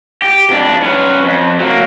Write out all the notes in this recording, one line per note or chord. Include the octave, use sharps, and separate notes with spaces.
G4
F2 D4
C#4 B4
F2
F#3 A#3